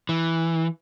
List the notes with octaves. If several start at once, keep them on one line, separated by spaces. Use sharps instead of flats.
E3